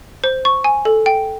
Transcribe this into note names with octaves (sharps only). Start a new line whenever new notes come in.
C5
C#6
G#5
A4
G5